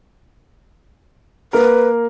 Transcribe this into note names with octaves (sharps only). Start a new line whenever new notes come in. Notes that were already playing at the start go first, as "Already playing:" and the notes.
A#3 A#4 B4